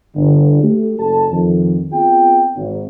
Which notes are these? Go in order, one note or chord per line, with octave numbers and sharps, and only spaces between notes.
G1 D3
A3 G4
F#1 A4 A5
F2 D#3
B3 C4 F4 G#4 G5
G#1